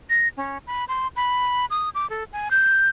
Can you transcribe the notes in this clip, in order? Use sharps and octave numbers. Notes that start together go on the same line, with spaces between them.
A#6
C#4
B5
C6
B5
D#6
D6
A4
G#5
G6